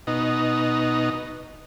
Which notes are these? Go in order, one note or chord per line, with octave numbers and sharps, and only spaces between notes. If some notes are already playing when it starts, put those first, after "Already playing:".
B2 D#4